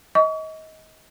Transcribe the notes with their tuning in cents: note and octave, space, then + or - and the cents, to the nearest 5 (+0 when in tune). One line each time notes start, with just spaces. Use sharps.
D#5 +25 C#6 +40